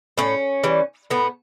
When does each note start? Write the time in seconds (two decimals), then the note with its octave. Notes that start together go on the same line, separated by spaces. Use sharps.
0.18 A2 C#4
0.63 E3 G3
1.10 A2 B3